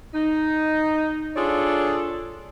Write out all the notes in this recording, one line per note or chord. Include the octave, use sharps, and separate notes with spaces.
D#4
D4 F4 G#4 A4 C#5 D5